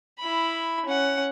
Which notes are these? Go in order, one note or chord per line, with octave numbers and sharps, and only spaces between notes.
E4 B5
C#4 F#5